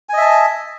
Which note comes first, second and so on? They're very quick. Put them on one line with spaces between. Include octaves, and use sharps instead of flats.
G#5 D#5 E5 A5